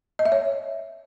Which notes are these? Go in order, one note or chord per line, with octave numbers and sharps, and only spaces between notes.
D#5
E5
C#5